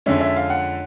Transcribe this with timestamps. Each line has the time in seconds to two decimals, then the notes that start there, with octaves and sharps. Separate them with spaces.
0.06 F2 D3 F3 G#3 C#4 E5
0.20 E5
0.36 F5
0.50 F#5